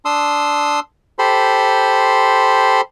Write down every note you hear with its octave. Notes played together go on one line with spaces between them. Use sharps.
D4 C6 D#6 E6
G4 A4 C5 B5 C6